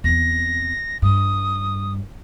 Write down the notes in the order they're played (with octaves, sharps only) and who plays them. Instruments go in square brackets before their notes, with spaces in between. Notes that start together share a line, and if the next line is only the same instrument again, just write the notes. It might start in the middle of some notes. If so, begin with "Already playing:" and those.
[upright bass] E2 C4 [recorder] A#6
[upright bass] G2 [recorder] D#6